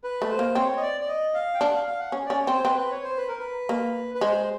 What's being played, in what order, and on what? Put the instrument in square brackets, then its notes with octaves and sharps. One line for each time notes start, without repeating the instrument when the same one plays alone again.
[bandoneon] B4
[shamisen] A3
[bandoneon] C5
[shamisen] A#3
[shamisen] C4 [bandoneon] C#5
[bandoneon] D#5
D5
D5
D#5
F5
G5
[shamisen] D4 [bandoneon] F#5
[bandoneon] F5
F5
F#5
[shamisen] C#4
[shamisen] C#4 [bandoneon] D5
[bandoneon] C#5
[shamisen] C4 [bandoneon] C5
[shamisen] C4 [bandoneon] B4
[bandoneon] B4
C#5
C5
B4
A#4
B4
[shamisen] A#3
[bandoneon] B4
[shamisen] G#3 [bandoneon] C5